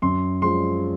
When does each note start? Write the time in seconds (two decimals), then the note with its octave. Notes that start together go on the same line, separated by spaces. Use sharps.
0.02 F#2 C6
0.42 F3 G#3 C6